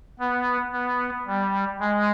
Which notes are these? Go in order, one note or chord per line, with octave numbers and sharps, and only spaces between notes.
B3
B3
G3
G#3